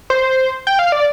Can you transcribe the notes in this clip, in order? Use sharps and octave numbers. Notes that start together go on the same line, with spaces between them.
C5
G5
F5
D5